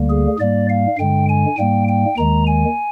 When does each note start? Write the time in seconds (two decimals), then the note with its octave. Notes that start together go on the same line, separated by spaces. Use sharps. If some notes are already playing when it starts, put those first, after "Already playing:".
Already playing: D2 D3 G3 A#3
0.10 G#4
0.39 G#2 G3 A#3 D5
0.70 F5
0.98 G2 D3 G#3 G5
1.29 G#5
1.58 G#2 G3 A#3 G5
1.88 G5
2.17 D#2 D#3 G#3 A#5
2.47 G#5